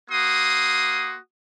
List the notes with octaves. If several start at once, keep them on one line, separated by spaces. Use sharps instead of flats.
A#3 F#4 C6 D#6